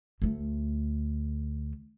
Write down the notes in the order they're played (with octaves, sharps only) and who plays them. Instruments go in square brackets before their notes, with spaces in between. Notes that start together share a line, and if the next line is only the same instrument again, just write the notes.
[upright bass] D2 A3